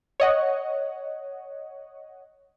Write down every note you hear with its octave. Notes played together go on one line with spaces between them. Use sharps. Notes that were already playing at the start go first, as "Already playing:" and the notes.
C#5 D#5 F#5